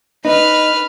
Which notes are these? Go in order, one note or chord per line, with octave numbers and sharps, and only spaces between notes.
D#4 B4 F6